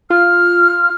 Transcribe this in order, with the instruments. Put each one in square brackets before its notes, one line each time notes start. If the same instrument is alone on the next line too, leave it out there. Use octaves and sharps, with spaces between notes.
[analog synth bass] F4 [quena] F6